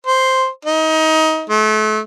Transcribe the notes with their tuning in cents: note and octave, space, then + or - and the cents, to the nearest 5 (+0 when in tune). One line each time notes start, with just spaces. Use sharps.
C5 +0
D#4 +25
A3 -35